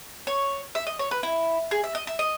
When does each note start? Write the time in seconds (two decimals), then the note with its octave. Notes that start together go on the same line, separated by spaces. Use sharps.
0.27 C#5
0.75 E5
0.87 D#5
0.99 C#5
1.11 B4
1.23 E4
1.71 G#4
1.84 E5
1.95 D#5
2.07 E5
2.19 D#5